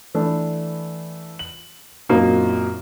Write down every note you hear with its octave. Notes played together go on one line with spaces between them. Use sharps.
E3 A3 D4
F#7
F#2 A#2 F#3 A#3 C4 D#4